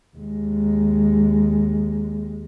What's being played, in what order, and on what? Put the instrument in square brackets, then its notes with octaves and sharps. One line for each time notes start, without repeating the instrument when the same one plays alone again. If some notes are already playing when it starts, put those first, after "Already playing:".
[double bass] D#2 G#3